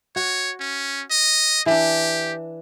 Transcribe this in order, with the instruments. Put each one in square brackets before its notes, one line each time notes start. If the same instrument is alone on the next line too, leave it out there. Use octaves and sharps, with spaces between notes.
[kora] F#4 [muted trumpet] C#5
[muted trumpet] C#4
D#5
[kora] E3 D4 [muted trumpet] G4